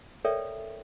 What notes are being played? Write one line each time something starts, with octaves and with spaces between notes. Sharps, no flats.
A4 A#4 C#5 D5 E5 G5